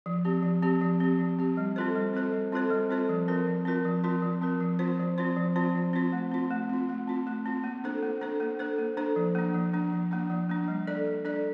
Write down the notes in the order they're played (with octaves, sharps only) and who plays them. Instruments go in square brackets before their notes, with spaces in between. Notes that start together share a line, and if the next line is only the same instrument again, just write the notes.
[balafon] F3
C4 G4
F3
C4 G4
F3
C4 G4
F3
C4 G4
G3
C4 F4 A4 C5
G3
C4 F4 A4 C5
G3
C4 F4 A4 C5
G3
C4 F4 A4 C5
F3
C4 F4 A#4
F3
C4 F4 A#4
F3
C4 F4 A#4
F3
C4 F4 A#4
F3
C4 F4 C5
F3
C4 F4 C5
F3
C4 F4 C5
F3
C4 F4 C5
A3
C4 F4
A3
C4 F4
A3
C4 F4
A3
C4 F4
A#3
D4 A4 C5
A#3
D4 A4 C5
A#3
D4 A4 C5
A#3
D4 A4 C5
F3
A#3 D4
F3
A#3 D4
F3
A#3 D4
F3
A#3 D4
G3
D4 A4 D5
G3
D4 A4 D5